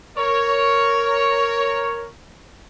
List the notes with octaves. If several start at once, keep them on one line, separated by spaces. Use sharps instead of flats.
A#4 C#5